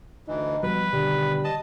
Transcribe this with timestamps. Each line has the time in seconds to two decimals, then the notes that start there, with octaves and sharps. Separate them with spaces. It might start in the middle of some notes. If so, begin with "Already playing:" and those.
0.28 D2 E3 D#4
0.63 B2 F3 G3 B4
0.93 B2 D3 D#3 G3
1.44 D#5 A5